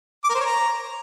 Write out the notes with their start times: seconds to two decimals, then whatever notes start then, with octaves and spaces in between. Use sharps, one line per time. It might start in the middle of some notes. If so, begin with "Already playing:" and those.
0.24 D6
0.29 A#4
0.35 C5
0.40 C#5
0.45 A#5